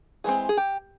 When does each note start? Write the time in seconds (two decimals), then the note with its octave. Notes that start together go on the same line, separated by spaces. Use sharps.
0.24 E3 G#3 C4 G#4
0.49 G#4
0.57 G4